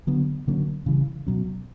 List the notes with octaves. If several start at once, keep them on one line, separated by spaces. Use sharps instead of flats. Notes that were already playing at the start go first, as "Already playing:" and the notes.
D3 F#3 B3
D3 F#3 A#3 C#4
C#3 E3 G3
B2 F#3 C#4